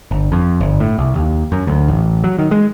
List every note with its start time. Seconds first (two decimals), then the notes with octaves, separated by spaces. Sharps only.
0.11 G1
0.32 F2
0.61 G1
0.80 A2
0.98 C2
1.15 D#2
1.52 F#2
1.67 D2
1.88 A1
2.24 F#3
2.39 D#3
2.51 G#3